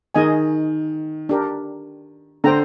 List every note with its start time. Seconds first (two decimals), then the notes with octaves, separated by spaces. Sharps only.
0.15 D#3 D#4 G#4 D#5 G#5
1.29 D4 G4 A#4
2.44 D3 C5 G5 A#5